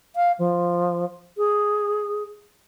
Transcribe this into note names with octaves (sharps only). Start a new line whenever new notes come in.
F5
F3
G#4